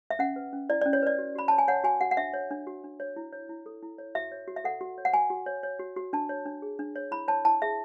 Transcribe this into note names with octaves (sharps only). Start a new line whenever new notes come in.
E5
C#4 F#5
B4
C#4
E4 D5
C#4 D5
C#5
B4 D5
F#4
F#4 B5
C#5 A5
G#5
C#5 F#5
F#4 G#5
F#4 F#5
F#5
D4 E5
C#5
D4
F#4
D4
C#5
E4
C#5
E4
A4
E4
C#5
F#4 E5
C#5
F#4
E5
A4 F#5
F#4
C#5
F#5
F#4 G#5
F#4
C#5
C#5
F#4
F#4
D4 A5
C#5
D4
G#4
D4
C#5
E4 B5
C#5 A5
E4 A5
G#4 E5